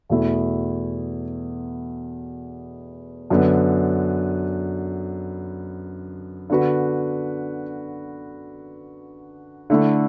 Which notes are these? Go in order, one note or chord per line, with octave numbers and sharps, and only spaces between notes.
E2 B2 A3 E4
F#2 D3 B3
D3 B3 F#4 B4
D3 A3 E4